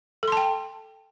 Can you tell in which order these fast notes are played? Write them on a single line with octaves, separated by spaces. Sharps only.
A4 C6 A5 G5